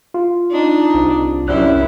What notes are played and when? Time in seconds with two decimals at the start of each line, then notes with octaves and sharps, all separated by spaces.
0.14 F4
0.52 D4 D#4
0.94 C2
1.48 C2 F#2 G3 E4 F#6